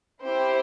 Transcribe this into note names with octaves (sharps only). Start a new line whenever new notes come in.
C4 E4 G4 C5